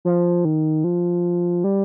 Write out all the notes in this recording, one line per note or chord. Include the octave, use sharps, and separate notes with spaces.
F3
D#3
F3
G3